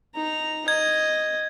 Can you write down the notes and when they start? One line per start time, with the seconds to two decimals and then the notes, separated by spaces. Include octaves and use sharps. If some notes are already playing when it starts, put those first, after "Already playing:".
0.15 D#4 A#5
0.68 D#5 G#6